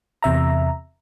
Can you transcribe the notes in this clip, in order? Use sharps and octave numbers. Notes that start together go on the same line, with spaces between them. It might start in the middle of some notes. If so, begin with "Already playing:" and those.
E2 C3 E5 A#5